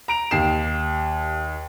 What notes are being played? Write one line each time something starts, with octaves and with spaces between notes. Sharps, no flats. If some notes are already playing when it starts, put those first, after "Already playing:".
A#5 D7 F7
D#2 G4 C7 E7